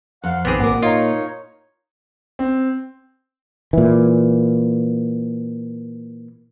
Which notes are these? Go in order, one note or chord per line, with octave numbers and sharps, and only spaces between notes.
F2 F5 F#5
A#1 D#3 B3 C4 G#4 D6
G#1 A#2 A#4 F#5
D#4 F4 C#5 D#5 F5 A#5
C4
A#2 E3